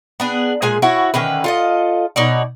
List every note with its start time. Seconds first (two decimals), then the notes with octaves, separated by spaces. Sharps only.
0.20 B3 D4 G#4
0.62 A#2 G#3 G#4 G#5
0.82 E4 F#4 C#5
1.14 D3 D#3 C#4 B4
1.44 F4 A4 D#5
2.16 B2 D#4 C#5 D5